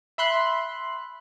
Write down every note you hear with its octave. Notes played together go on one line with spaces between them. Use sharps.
E5 B5 C6 F#6